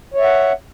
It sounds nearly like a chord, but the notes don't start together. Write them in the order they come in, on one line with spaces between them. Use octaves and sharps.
C#5 E5 F#5